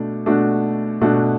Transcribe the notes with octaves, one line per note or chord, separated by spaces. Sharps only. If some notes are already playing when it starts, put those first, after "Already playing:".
Already playing: B2 A3 D4
B2 A3 D4 F#4
B2 A3 D4 F#4